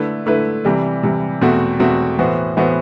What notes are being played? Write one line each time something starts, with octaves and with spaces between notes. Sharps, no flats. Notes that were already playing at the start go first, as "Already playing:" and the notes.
Already playing: D3 A3 E4 B4
D3 A3 E4 B4
C3 E3 G3
C3 E3 G3
E2 B2 A3 C4 F#4
E2 B2 A3 C4 F#4
A2 E3 B3 F#4 C5
A2 E3 B3 F#4 C5